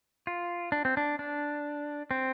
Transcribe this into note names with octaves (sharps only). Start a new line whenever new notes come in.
F4
D4
C4
D4
D4
C4